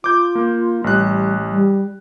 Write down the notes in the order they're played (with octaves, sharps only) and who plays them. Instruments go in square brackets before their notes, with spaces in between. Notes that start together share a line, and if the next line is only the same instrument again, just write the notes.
[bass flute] F4 [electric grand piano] D6 G6
[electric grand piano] A#3
[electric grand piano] A1 F#6 [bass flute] G3
[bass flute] G3